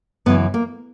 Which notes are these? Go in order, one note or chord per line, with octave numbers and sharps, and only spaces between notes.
F#2 C#3 E3 B3
A#3